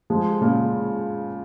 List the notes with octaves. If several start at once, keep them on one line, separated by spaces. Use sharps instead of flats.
F3 G#3
A#2 C#3